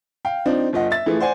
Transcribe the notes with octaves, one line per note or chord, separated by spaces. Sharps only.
F5 G5
F3 C4 D4 D#4
G1 F4 D#5 F#5
E5 A6
E3 F3 A3 E4 F4 G#4
C5 D5 F#5 G#5